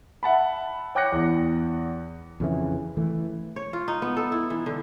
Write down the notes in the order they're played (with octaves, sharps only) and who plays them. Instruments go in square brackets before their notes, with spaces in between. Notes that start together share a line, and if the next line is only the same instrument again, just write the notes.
[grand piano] E5 F#5 A5 B5
C#5 G5 D6 F#6 A#6 C#7
E2
[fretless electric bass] F2 C#3 E3
E3 A3
[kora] C#5
F4
D#4
B3
A4
E4
E3
D3